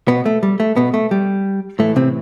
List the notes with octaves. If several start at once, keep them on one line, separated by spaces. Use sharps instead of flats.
B2 B3
A3
G3
A3
B2 B3
A3
G3
A2 E3 A3
C3 C4